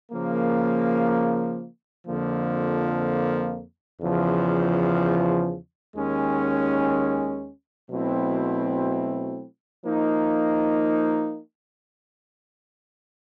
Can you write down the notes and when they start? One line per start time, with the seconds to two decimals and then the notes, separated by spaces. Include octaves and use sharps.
0.12 C#3 F3 A#3
2.06 F2 D3 F3 A#3
4.01 E2 C#3 F3
5.95 D#2 D#3 G#3 C#4
7.90 B2 F#3 A3 C4 E4
9.84 F3 A#3 D#4